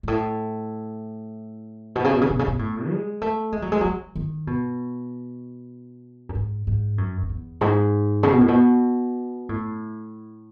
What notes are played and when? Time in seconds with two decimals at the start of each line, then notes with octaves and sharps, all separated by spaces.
0.03 G#2
0.08 A2
1.95 B2
2.04 C#3
2.13 B2
2.21 C#3
2.30 B2
2.39 C#3
2.47 B2
2.59 A2
2.90 G#3
3.22 A3
3.52 G#3
3.62 F#3
3.72 G#3
3.81 F#3
3.84 E3
4.15 D#3
4.47 B2
6.29 F#2
6.35 G#2
6.67 G#2
6.98 F#2
7.22 F#2
7.29 E2
7.61 G#2
8.23 C#3
8.32 B2
8.41 A2
8.48 B2
9.49 A2